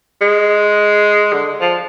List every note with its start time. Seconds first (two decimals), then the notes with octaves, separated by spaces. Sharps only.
0.21 G#3
1.33 D3
1.61 F3